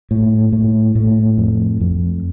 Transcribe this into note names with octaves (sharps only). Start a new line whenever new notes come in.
A2
A2
A2
F2
F2